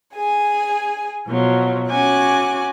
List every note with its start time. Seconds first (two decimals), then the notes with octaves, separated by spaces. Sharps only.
0.14 G#4 G#5
1.28 B2 F3 F#3
1.91 C#4 F#4 G#5 D6 F#6